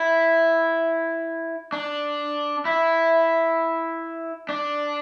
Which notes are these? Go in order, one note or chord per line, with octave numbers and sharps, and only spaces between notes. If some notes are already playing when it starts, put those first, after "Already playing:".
Already playing: E4
D4
E4
D4